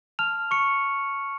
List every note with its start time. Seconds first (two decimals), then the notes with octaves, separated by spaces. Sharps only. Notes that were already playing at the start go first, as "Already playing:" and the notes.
0.19 A5 F6 F7
0.51 C#6 F6 C#7